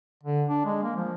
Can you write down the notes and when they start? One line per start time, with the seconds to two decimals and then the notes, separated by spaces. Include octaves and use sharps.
0.24 D3
0.49 D4
0.66 G#3
0.83 A#3
0.96 F3